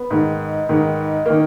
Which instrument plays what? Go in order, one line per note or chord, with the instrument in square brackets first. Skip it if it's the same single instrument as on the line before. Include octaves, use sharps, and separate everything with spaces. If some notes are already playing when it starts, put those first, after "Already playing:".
Already playing: [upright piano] B3
G#2 D#3
G#2 D#3
D#3 A#3